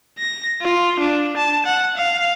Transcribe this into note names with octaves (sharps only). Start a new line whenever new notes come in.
A#6
F4
D4
A5
F#5
F5